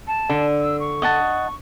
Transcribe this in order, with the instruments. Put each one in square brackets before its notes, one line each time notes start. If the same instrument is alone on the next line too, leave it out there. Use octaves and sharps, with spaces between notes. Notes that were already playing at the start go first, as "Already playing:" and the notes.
[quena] A5
[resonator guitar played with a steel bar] D3
[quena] E6
C#6
[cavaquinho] D#5 F#5 A5